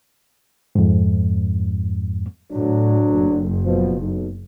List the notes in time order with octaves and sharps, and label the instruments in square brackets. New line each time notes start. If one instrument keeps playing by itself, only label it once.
[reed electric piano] F2 G#2
[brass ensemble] D2 F#3 D4 [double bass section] A2
[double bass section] F#1
[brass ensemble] B2 F3
B1